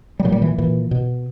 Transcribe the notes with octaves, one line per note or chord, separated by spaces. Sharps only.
G3
A#2 F#3
G3
E3
A#2 E3
B2